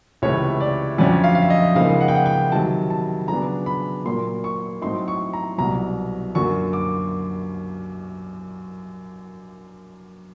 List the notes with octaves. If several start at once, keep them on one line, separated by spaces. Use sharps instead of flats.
C#2 C3 E3 A3 C#5
D5
F2 D3 F#3 A3 C#4 D5
F5
F5
E5
D#5
C#2 C#3 F3 A#3 D#4 F5
F#5
G5
F#5
G5
C3 D#3 F#3 A5
A5
C#3 F#3 B3 D4 A#5
B5
A#2 F#3 A#3 C6
C#6
A2 F#3 A3 C4 D#4 C6
C#6
A#5
C2 B2 F#3 A#5
F#2 D3 F#3 A#3 C#6
D6